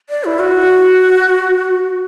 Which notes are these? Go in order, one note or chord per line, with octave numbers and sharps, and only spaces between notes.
D5
E4
F#4